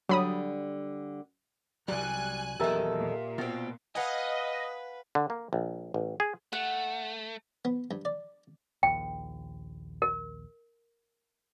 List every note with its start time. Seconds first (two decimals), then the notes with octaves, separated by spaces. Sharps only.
0.09 D3 F#3 G3 B5 D#6
1.88 C2 F#3 G3 G#5 F#6
2.60 D#1 E2 D#3 F#3 G4 A4 A#4 E5
2.96 A#2
3.38 B2 C4 F4
3.95 B4 D#5 F5 F#5 G#5
5.15 D3
5.30 A#3
5.53 A#1
5.94 A1
6.20 G#4
6.53 A3 F#5
7.65 B3
7.91 G2
8.05 D5
8.83 A#1 D#2 G5
10.02 A#4